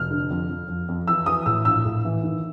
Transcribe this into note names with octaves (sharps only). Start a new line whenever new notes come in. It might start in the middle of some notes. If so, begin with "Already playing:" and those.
Already playing: F1 F6
D3
F2
F2
F2
F2
E3 E6
E3 D#6
A2 E6
A#1 E6
A2
E3
D#3